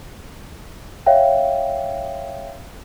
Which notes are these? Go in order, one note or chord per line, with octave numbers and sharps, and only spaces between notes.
C#5 E5 F5 G5